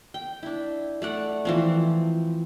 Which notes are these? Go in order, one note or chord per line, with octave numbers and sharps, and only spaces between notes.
G5
D4 E4
A3 D5 F#5
E3 F3 C4